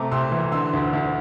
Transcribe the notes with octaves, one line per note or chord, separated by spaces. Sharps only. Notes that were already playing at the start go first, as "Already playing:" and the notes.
Already playing: C3 A3 A#5 D6
C2 C6 E6
E3
D3 C6 E6
D2
D2